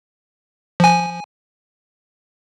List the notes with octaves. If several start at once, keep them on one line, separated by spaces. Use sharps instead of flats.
F3 G#5